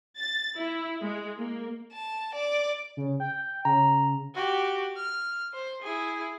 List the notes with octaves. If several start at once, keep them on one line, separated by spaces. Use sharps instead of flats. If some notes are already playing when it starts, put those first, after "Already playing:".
A6
E4
G#3
A#3
A5
D5
C#3
G5
C#3 A#5
F#4 G4
F6
C5
E4 G#4